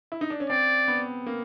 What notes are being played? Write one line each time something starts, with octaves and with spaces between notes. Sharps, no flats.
E4
D#4
D4
C#4
C4 D5
B3
A#3